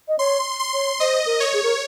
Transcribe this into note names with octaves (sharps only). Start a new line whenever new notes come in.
D#5
C#5 C6
C6
C#5
C5 D#5
A#4
C#5
G#4
A#4